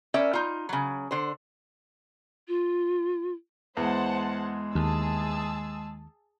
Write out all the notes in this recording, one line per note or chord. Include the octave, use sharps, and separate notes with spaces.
C#4 A#4 D5 E5
D#4 F4
C#3 F#3
D3 C5
F4
E2 G#3 C5 F#5 A5
D#2 G#4 A5 E6